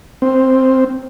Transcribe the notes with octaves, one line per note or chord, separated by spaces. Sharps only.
C4